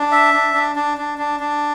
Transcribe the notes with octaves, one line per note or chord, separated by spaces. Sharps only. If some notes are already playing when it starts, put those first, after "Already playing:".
Already playing: D4
E5
D4
D4
D4
D4
D4
D4